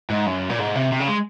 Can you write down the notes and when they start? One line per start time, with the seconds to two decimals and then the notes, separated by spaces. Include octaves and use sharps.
0.10 G#2
0.26 F#2
0.50 A#2
0.59 G#2
0.75 C3
0.92 C3
1.00 C#3
1.08 G#3